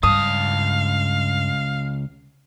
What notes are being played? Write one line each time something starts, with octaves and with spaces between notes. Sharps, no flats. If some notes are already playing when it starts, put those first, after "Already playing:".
C#2 G2 F5 A5 D#6